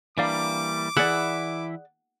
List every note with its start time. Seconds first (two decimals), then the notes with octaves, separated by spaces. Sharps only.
0.18 E3 G3 A#3 D4 D5 F5 D6
0.97 E3 E4 G#4 D5 E5 F#5